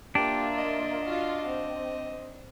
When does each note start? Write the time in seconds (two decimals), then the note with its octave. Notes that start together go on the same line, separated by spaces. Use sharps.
0.15 A#3 D4 F4 G4 E5
0.58 D#5
1.05 F4 F#4 F5
1.46 C4